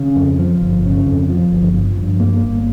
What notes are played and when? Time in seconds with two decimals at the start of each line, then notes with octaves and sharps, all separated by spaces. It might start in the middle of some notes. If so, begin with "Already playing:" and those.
Already playing: C#3
0.16 F2
0.39 F3
0.61 G1
0.84 C#3
1.07 F2
1.30 F3
1.52 G1
1.74 F3
1.97 G2
2.20 A#3
2.42 G1